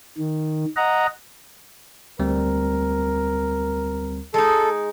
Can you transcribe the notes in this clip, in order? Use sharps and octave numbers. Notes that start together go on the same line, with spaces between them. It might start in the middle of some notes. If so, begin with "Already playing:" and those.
D#3
D#5 F#5 A#5
D2 G3 C4 A#4
G#3 D#4 A4